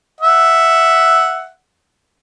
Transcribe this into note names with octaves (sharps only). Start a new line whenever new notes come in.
E5 F#5